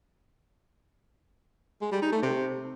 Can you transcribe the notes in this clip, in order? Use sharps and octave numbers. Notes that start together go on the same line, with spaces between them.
G#3
G3
D#4
A3
C3